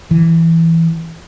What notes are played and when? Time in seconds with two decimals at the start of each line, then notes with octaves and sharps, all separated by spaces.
0.11 E3